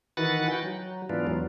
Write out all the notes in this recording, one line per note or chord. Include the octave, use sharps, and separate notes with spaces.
D#3 E3 F#4 B4 F#5 A6
F#4 G5
F#3
G#2 E3 B3 D4 F4
E2 F#3